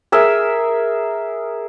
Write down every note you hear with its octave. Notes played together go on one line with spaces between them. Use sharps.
G#4 A#4 E5